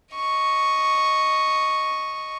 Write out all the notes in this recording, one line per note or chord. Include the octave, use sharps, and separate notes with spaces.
D#5 C#6